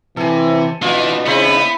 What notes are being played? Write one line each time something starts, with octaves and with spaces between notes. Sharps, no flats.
C3 E3 A4 G#5
B2 E3 D4 D#4 F4
C#3 B3 E4 C5 B5